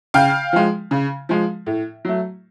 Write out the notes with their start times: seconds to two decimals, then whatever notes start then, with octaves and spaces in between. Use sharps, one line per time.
0.14 C#3 F5 G5
0.53 F3 G#3
0.91 C#3
1.29 F3 G#3
1.66 A2
2.05 F#3 A3